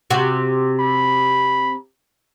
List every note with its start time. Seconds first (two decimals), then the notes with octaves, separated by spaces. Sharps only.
0.10 C3 F#4
0.80 B5